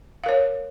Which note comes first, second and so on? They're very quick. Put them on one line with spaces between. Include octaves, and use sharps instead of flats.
F5 A#4 C#5